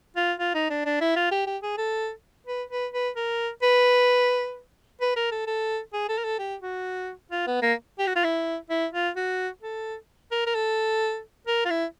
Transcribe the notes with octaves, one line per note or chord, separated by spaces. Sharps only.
F4
F4
D#4
D4
D4
E4
F4
G4
G4
G#4
A4
B4
B4
B4
A#4
B4
B4
A#4
A4
A4
G#4
A4
A#4
A4
G4
F#4
F4
B3
A#3
G4
F#4
F4
E4
E4
F4
F#4
A4
A#4
A#4
A4
A#4
F4
E4